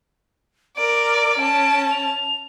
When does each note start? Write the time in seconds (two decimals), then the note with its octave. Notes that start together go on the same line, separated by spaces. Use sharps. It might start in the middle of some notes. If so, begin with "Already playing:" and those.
0.77 A#4 D5 D7
1.39 C#4 A5
1.91 F7